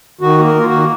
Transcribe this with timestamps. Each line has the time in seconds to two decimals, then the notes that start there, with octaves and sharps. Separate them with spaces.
0.21 D#3 F#4
0.39 A#3
0.44 A#4
0.55 A#3
0.61 F4
0.66 F#4
0.71 D#3